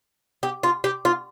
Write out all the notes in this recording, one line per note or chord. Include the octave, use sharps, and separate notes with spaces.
G4
F4
G4
F4